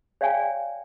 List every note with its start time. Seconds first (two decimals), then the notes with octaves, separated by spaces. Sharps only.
0.21 C#5 D5 F5 G5 G#5